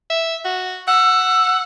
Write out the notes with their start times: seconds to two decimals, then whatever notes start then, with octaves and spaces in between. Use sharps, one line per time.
0.10 E5
0.45 F#4
0.88 F#5 E6